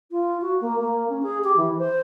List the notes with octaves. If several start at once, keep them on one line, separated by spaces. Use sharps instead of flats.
F4
F#4
A#3
A#3
C#4
G#4
G4
E3
C5